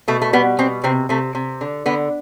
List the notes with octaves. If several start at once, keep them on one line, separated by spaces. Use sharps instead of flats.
B2 A3
A3
G3 B3
B2 C4
C3 C4
C3 A3
C3
D3
D3 B3